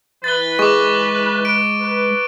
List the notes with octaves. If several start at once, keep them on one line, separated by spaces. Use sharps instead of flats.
E3 B4 A6 G7
G#3 C#6 D6
D7
B4